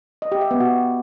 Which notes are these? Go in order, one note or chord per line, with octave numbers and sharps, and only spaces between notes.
D#5
G4
E5
B3
F#4